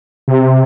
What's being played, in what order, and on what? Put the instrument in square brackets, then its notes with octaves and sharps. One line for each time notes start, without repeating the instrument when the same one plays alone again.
[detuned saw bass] C3